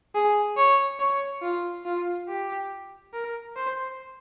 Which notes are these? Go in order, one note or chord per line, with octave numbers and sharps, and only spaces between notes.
G#4
C#5
C#5
F4
F4
G4
A#4
C5